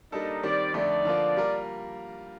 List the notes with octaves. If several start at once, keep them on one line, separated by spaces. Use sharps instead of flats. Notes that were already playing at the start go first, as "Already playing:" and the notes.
G3 A#3 D4 D#4 A4
D#3 G3 C4 D5
F2 D3 A3 D#4 D5
D3 F3 A#3 F4
G3 A#3 F4 A#4